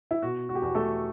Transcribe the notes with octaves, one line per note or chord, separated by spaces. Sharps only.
E4
B2 F#4
F#4
G4
E2 F#4
A3 A4